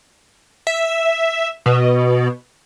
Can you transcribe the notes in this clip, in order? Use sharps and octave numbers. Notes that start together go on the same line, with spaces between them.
E5
B2